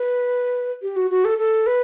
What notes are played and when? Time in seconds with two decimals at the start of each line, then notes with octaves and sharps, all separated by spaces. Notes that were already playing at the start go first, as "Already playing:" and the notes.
Already playing: B4
0.82 G4
0.96 F#4
1.11 F#4
1.25 A4
1.39 A4
1.67 B4